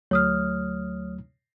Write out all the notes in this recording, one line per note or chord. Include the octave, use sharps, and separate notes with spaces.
D2 F#3 A3 C#5 D#6 F6